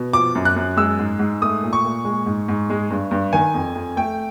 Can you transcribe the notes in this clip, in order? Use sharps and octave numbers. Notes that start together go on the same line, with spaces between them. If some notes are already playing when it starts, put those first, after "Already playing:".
Already playing: B2
F3 D6
F#2
F#6
F#2
G#3 E6
G#2
G#2
A3 D#6
A#2
C#6
A#2
G#3
G#2
G#2
G#3
G2
G2
D#3 G#5
F2
F2
A3 G5